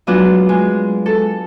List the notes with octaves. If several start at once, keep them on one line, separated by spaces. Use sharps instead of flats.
F#3 G#3 B3 D4 F4 F#4
G#3
A4